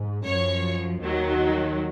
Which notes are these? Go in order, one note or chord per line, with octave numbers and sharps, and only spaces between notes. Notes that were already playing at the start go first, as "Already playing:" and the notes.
Already playing: G#2
F#2 F3 C#5
D#2 D#3 F#3